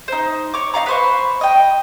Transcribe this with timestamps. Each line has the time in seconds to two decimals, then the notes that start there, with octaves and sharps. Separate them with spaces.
0.08 D#4 C5
0.54 C#5 C#6 D6
0.74 D#4 D#5 F5 A#5
0.86 B4 C5 C#6
1.41 D#5 G5